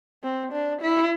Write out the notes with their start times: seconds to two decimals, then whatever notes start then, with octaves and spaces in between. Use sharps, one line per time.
0.23 C4
0.52 D4
0.81 E4